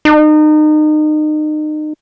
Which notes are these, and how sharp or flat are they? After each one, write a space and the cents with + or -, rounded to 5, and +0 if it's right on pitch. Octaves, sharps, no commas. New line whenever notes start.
D#4 -30